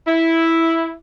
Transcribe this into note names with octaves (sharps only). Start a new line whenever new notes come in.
E4